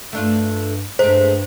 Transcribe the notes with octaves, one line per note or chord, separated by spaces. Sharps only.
G2 A3 D4 F4
G2 G#3 A3 C4 C5